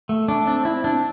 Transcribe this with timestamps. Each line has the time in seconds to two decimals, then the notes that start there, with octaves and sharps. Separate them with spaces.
0.09 A3
0.28 A3 D4
0.47 C4 D4
0.65 C4 E4
0.84 C4 D4